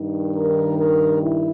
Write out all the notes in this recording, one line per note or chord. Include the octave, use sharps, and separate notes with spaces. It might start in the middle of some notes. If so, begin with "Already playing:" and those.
Already playing: G2 D#3
A#4
A#4
E4